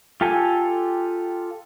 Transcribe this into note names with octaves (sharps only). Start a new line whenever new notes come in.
F4 G4 A4 G#5